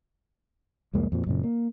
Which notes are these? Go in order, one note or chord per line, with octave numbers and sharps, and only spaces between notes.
C2 F2 G#3 A#3
F2 A#2 F3
F#2 A#2 C#3
A#3